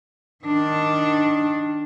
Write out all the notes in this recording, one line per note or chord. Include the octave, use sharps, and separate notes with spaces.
D#3 D4